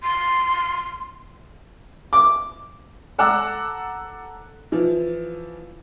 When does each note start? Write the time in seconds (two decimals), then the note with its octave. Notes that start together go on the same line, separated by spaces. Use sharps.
0.03 C6
2.13 D6
3.18 A4 F#5 A#5 D6 E6
4.72 E3 F3